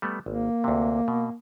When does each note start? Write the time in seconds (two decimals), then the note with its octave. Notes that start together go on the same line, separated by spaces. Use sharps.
0.02 G3 A3 B3
0.26 G#1 A#3
0.64 D2 C3
1.08 B2